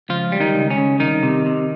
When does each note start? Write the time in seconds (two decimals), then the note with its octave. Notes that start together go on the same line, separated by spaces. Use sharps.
0.09 C#2 F3 F4
0.32 G3
0.40 D#3 D#4
0.55 C#2
0.70 C#4
0.78 C#3
1.00 C2 D#3 D#4
1.23 C3
1.46 C3